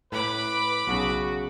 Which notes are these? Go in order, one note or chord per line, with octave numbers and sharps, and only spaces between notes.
A2 B4 B5 D6
B1 C#3 F#4 G#4